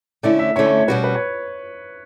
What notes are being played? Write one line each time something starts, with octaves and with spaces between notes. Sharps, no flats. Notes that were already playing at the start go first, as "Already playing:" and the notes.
D3 A3 C#4 E4 D5
E5
D3 A3 C#4 E4 C#5
C#5
C#5
B2 G3 C#4 F#4 B4
B4
C#5